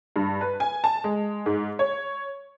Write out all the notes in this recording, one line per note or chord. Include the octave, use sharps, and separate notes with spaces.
G2
B4
G#5
A5
G#3
G#2
C#5